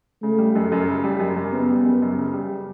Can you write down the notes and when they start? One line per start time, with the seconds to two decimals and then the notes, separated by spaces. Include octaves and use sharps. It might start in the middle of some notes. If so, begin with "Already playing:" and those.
0.22 C#3 A3
0.38 G3
0.55 F#2
0.72 F#2
0.87 C#3
1.04 G3
1.19 F#2
1.36 F#2
1.52 C#3 B3
1.69 G3
1.85 F#2
2.02 F#2
2.18 C#3
2.33 G3